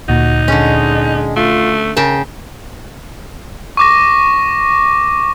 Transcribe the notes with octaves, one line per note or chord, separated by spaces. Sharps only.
D2 A#2 D#4 F#4
D3 G#3 C#4
A3 F4
C#3 A#4 G5 A5
C#6 D6 A#6